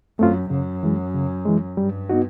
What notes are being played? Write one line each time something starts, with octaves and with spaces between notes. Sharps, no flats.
F#2 A3 C4 F4
F#2 C#3
E3 G#3
C#3
E3 G#3
G2 G3
B3 D#4 F#4